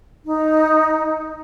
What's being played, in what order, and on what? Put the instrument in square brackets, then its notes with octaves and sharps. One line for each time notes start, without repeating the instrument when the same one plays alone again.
[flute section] D#4